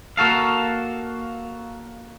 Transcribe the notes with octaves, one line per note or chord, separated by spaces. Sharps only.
A#3 F#4 A4 F5